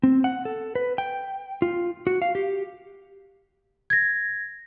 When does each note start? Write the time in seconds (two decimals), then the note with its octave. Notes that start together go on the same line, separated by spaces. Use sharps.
0.03 C4
0.24 F#5
0.45 A4
0.75 B4
0.98 G5
1.62 F4
2.07 F#4
2.22 F5
2.35 G4
3.90 G#6 A#6